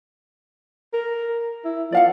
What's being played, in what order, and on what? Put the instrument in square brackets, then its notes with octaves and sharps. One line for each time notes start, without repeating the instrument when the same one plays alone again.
[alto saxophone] A#4
E4
[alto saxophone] F3 [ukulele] D5 F5 F#5